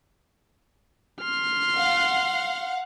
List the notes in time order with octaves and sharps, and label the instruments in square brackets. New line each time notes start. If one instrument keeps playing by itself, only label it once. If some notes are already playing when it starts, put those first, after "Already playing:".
[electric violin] C6 F6
[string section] F5 F#5